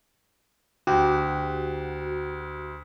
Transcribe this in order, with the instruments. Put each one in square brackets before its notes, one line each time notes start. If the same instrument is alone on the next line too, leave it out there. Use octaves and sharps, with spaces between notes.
[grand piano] D2 [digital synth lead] F#4 [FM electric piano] G4